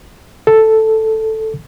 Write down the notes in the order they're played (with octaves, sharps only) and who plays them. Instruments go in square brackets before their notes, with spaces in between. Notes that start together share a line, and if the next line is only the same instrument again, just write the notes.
[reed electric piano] A4